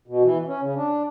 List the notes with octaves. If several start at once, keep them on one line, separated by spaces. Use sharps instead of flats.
B2
E3
C#4
C#3
D4